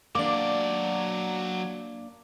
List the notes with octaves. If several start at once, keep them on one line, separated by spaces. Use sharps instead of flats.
F#3 A#3 D4 D5 D6